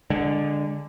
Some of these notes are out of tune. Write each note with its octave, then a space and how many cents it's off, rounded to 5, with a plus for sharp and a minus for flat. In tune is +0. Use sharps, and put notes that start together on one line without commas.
D3 +0 G#3 -20